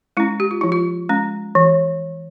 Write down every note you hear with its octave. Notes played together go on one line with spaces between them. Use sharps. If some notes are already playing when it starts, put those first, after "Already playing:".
G#3 C#4 E4
G4
F4
F3 E4
F4
G#3 C#4
E3